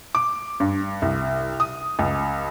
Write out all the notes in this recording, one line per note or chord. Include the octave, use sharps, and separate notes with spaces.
D6
G2
C2
D#6
C#2